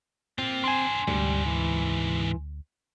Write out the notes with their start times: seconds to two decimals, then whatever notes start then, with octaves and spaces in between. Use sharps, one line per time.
0.39 A#3 C4 F4
0.64 D4 C5 G#5 C6
1.08 D2 G#2 C3 G3
1.46 E3